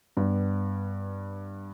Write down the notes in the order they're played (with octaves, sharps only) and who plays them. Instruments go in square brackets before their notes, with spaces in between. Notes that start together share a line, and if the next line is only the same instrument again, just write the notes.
[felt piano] G2 B3